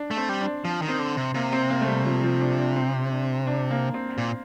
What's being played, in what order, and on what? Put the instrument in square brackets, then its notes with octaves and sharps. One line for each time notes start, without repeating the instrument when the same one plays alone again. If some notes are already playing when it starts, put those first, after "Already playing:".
Already playing: [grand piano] D4
[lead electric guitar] A3
[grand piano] C4
[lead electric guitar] G3
[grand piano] D4
[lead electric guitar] F3
D#3
[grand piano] C4
[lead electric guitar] D3
C3
[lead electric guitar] C3 [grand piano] A#3
[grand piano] C4
A#3
A3
G3
F3
F3
D4
D4
C4
D4
D4
A#3
C4
[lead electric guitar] A#2